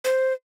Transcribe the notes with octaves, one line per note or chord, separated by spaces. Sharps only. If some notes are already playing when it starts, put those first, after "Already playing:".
C5